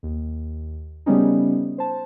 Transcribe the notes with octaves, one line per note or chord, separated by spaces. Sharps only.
D#2
C#3 G3 A3 B3 C#4 D#4
C5 A5